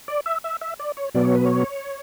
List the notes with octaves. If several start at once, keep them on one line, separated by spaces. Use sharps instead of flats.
D5
E5
E5
E5
D5
C#5
B2 F#3 B3 D5
C#5
B4
C#5